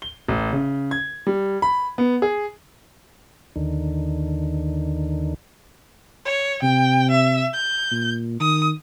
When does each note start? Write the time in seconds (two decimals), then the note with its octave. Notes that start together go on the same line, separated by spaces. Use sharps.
0.02 G7
0.28 A1
0.53 C#3
0.91 G#6
1.27 G3
1.62 B5
1.98 B3
2.22 G#4
3.56 D#2 D3 D#3
6.25 C#5
6.63 C3 G5
7.11 E5
7.53 G6
7.91 A#2
8.40 D#3 D#6